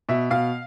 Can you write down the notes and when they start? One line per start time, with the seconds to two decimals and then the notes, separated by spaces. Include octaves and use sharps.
0.09 B2 E5
0.30 B2 F5